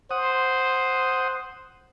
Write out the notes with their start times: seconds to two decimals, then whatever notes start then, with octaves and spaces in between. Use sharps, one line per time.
0.11 C5 F#5 D#6